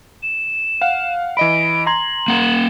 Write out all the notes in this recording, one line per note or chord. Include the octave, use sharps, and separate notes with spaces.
E7
F5 F#5
E3 D#5 B5 D7
A#5 C6 G#6 F#7
A#3 F#5